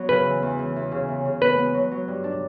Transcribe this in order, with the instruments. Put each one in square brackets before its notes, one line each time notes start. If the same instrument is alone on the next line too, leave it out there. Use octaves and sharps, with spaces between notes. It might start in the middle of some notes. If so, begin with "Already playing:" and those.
Already playing: [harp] F#3 B3 F#4
[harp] C#3 [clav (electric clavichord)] B4
[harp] E3
E2
E3
E2
C#3
E2
C#3
[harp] B3 [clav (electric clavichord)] B4
[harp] B3
F#3
F#3
G2
D4